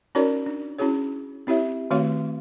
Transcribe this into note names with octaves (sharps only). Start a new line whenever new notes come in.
C#4 D#4 F#4 A#4 C#5 D5
D4
C#4 E4 F#4 G#4 C#5
C4 E4 G4 C#5 E5
D#3 A3 C4 F#4 C#5 F5